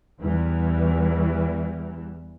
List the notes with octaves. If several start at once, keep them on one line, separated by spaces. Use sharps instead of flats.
E2 E3 G3